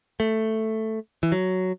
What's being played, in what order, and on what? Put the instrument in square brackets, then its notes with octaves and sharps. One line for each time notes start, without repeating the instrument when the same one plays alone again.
[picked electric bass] A3
E3
F#3